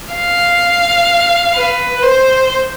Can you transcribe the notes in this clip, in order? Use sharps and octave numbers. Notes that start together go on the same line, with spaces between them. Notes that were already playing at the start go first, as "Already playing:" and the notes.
F5
B4
C5